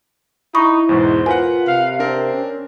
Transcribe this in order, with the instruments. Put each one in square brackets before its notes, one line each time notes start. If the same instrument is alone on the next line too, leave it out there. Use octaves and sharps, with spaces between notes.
[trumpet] D#4 [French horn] E4 [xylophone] B5 C#6 D#6
[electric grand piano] E2 G#2 B2 [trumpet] C5
[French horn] F4 [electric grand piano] A#4 B4 F#5 [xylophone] G#5
[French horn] C3 [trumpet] F5
[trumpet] C4 [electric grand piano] D4 A#4
[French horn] C#4